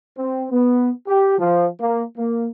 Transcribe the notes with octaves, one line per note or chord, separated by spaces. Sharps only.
C4
B3
G4
F3
A#3
A#3